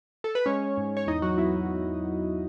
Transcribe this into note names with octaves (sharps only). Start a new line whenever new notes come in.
A4
B4
G#3 C#4 C#5
G#2
C#5
E2 D#4 D#5
F#3 F#4
B3 E4